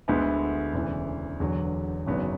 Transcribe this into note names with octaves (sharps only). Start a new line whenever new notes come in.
D2 D3 G#3 B3 E4
E1 D2 C#3 E3
E1 E2 D3 F#3
G#1 F#2 C#3 F#3 B3